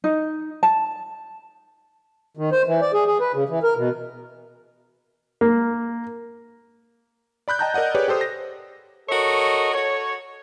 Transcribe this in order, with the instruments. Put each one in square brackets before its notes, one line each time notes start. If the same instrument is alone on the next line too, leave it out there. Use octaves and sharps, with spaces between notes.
[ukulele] D#4
A5
[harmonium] D#3
C5
E3
D5
G#4
G#4
B4
C#3
E3
A#4
B2
[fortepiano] A#3
[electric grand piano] D5 B5 F#6 G6
D#5 G5 A5 A#5 F#6 G6
A#4 D5 D#5 F#5
G4 G#4 B4 C#5 D5
G4 A4 C5 D#6
A#6
[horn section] F#4 A4 A#4 C#5 D#5
F#4 A4 C#5